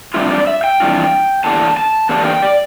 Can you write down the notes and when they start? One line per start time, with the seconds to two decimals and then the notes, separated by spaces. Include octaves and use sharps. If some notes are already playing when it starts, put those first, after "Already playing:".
0.14 F2 E3 G3 D4 F4 E5
0.31 D5
0.47 E5
0.64 G5
0.80 F2 E3 G3 D4 F4
1.44 E2 D3 G3 A#3 A5
1.77 A5
2.09 E2 D3 G3 A#3 A5
2.26 G5
2.42 D5